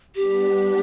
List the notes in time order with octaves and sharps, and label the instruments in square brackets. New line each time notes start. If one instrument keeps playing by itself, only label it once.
[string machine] G3 B3 D4 [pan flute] G4